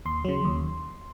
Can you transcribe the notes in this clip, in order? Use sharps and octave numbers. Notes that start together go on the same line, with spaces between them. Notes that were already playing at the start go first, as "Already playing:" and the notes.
D#2 C6
C#3 F#3
D#2